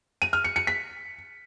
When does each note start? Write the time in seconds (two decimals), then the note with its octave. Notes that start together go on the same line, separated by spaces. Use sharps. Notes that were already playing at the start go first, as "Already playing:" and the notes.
0.22 D#7
0.33 F6
0.44 C#7
0.56 C#7
0.67 B6